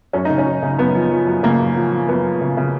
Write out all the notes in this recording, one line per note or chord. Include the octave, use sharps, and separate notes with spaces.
F#2 C#4
C#3 D#4
C#4
F#2
C#3
F#2 B3
F3
F3
F#2
C#3 A#3
F#2
F3
F3
F#2 B3
F3
C#3
C#3